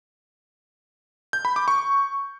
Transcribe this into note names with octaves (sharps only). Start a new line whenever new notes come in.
G6
B5
D6
C#6